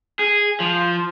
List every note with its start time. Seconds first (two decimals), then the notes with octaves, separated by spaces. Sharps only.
0.19 G#4
0.60 F3